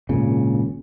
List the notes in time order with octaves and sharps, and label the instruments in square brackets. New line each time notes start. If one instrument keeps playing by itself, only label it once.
[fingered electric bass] G#1 A#2 C#3